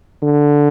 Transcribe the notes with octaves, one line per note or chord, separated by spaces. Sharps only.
D3